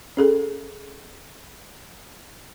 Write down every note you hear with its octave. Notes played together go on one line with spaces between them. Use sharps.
C#4 G#4 A4